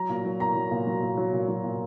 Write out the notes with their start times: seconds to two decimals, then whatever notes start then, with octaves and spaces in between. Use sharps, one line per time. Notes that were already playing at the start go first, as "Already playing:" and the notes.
Already playing: F#3 A#5
0.09 A#2
0.25 F#3
0.40 A#2 A#5
0.55 F#3
0.71 A#2
0.87 F#3
1.02 A#2
1.17 F#3
1.33 A#2
1.48 F#3
1.64 A#2